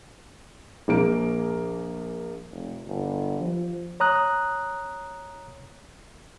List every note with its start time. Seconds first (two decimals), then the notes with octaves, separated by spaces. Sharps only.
0.88 A#1 A#3 D7
2.51 F1
2.86 G1
3.40 F3
4.00 C#5 A#5 D#6 F#6